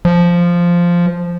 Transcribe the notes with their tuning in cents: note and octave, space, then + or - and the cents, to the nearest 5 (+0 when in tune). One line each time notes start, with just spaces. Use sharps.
F3 -5